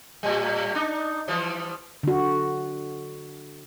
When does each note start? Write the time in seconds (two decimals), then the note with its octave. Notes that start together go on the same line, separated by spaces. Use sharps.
0.23 A2 G3
0.75 D4 D#4
1.28 E3 F3 G3
2.03 D3 F#4